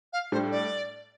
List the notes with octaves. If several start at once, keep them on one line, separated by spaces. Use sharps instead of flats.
F5
A2 G3 D4 C5
D5